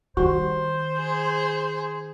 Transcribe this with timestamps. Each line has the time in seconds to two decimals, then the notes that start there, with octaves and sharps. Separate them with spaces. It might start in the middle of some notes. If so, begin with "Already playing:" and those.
0.17 D#3 G3 F#4 C5
0.98 G#4